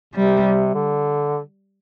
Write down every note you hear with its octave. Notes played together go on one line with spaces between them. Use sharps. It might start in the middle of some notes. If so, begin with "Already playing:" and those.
C3 G3
D3